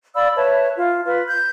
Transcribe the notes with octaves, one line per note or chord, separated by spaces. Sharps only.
D5 F5 B5 E6
B4 C#5 E5 A5
F4
F4 B4
G6